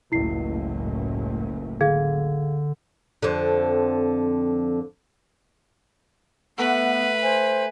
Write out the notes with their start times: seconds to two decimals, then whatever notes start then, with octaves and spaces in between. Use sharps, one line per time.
0.12 F#1 C#2 A2 E4 C7
1.81 D3 G#4 F5 G#6
3.22 F2 D3
6.58 A3 B3 B4 F#5
7.23 C5 G#5